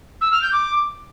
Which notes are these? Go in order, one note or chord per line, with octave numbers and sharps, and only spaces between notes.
E6
F6
G6
D6